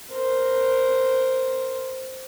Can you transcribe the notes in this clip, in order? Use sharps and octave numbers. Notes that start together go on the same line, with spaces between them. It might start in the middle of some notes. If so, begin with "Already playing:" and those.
A#4 C5